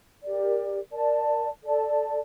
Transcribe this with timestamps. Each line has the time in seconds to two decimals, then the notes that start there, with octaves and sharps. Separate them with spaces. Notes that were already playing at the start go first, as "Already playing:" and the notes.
0.22 G4 A#4 D5
0.91 A#4 D5 A5
1.63 A4 D5 A5